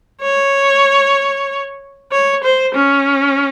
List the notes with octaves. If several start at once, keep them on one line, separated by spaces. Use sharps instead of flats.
C#5
C#5
C5
C#4